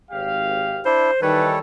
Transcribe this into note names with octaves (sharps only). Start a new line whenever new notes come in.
G#1 G4 F5
D4 E4 C5
D#3 E3 G3 A4 B4 C#5